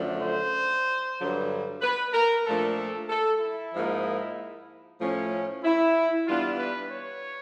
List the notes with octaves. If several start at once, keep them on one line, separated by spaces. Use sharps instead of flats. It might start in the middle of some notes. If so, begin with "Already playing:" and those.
Already playing: F#2 D3 F3 A3
C5
G2 D3 F#3
B4
A#4
A#2 F3 A3 D4 A4
A4
A4
E4
G#2 F3 A#3 D#4
A2 F3 A3 C#4
E4
E3 G3 B3 D4 F4
B4
C#5